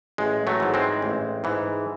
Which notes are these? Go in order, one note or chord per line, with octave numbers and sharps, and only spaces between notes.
A1 G#3
F#3 A3
G#2 E3
G#3 C4
A1
G#2 E3